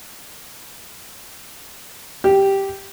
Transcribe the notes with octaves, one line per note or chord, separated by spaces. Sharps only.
G4